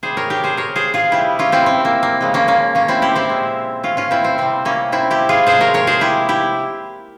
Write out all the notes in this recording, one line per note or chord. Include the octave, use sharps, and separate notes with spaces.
C3 G3 G#4 C5
A#4 C#5
G4 A#4
G#4 C5
A#4 C#5
G#4 C5
F4 G#4
C3 G3 E4 G4
C#4 F4
C4 E4
C4
A#3
A#3
C#3 F3 G#3
A#3 C#4
A#3 C#4
A#3 C#4
C4 E4
E4 G4
C4 E4
A#2 G#3
C#4 F4
C#4 F4
C4 E4
C4
C3 G3 C4
A#3 C#4
C4 E4
E4 G4
F4 G#4
C3 F3 G#3 G#4 C5
A#4 C#5
A#4 C#5
G#4 C5
E4 G4
E4 G4